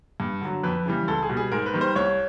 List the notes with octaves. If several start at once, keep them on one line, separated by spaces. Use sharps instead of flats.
G2
D3 F#3
F2 B4
C#3 E3 G3
C#2 A4
G#4
B2 G3
G#4
G#2 A#4
B4
D#3 G3
C5
C2 C#5